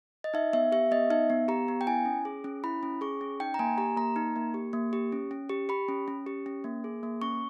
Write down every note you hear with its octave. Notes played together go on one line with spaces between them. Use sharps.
D#5
D#4 E5
B3 E5
G4 E5
B3 D#5
D#4 E5
B3
G4 A#5
B3
G5
E4 G#5
C#4
G#4
C#4
E4 B5
C#4
G#4 C#6
C#4
D#4 G5
A#5
A#3 G#5
G4 A#5
A#3 A#5
D#4
A#3
G4
A#3
G4
C#4
C#4
G4
G4 B5
C#4
C#4
G4
C#4
A#3
G#4
A#3
C#4 C#6